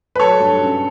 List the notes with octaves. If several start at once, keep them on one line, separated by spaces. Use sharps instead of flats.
B4
F#3 A4 C#5
G2
C#4